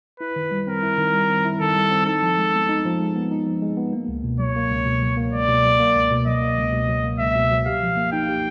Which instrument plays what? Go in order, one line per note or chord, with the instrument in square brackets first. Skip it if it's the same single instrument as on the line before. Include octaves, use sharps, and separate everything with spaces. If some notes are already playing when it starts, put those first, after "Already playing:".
[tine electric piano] E4 [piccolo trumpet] B4
[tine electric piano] D#3
G3
[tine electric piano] C4 [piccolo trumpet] A#4
[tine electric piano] E4
D#3
G3
C4
E4
[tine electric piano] D#3 [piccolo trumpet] A4
[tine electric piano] G3
C4
[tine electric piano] D#4 [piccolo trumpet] A4
[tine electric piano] F3
G#3
B3
D#4
F3
G#3
B3
D#4
F3
G#3
B3
A#3
C#2
B2
[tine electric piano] F#3 [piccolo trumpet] C#5
[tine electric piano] A#3
C#2
B2
F#3
A#3
[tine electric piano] C#2 [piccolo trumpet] D5
[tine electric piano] B2
F#3
A#3
C#2
B2
[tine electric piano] F#3 [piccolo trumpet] D#5
[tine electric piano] A#3
C#2
B2
F#3
A#3
[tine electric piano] C#2 [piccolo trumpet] E5
[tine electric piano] B2
F#3
[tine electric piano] G4 [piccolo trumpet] F5
[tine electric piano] F3
A#3
[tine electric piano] D#4 [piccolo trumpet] G5
[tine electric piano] G4